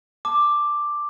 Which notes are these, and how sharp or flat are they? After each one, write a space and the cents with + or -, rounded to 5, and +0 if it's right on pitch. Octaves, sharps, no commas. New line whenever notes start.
A5 +0 D6 +5